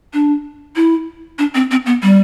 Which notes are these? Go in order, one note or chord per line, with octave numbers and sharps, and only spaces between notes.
D4
E4
D4
C4
C4
B3
G3